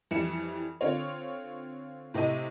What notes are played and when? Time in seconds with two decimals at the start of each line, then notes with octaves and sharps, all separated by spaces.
0.11 F2 E3 G3 C#7 E7
0.81 D3 C4 F4 C#5
2.14 A2 C3 G4 D#5 D#7